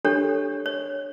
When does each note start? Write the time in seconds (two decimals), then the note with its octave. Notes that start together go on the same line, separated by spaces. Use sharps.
0.05 D4 G4 A4 C#5
0.66 C#5